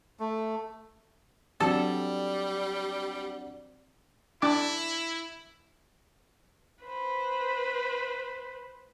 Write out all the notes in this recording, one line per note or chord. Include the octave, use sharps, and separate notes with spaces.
A3
F#3 G3 C4 D4 A4
D4 E4 D6
B4 C5